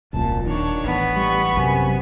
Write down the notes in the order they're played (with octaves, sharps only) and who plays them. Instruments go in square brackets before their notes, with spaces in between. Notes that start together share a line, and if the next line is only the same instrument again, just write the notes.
[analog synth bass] D#1 [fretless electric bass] C2 F#2 A#2 [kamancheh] A5
[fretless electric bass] D#3 [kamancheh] D4 C#5
[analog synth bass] A1 [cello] B3
[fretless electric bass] G3 [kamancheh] B5 C#6
[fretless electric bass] F#2 [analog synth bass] C3 [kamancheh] G#5